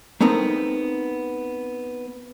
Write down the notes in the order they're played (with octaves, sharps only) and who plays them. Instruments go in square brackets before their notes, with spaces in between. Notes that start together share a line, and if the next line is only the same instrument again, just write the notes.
[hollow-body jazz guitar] A3 B3 C4 D#4 A#4